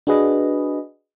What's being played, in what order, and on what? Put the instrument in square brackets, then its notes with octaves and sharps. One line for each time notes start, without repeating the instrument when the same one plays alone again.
[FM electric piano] D4 F#4 G#4 B4 D#5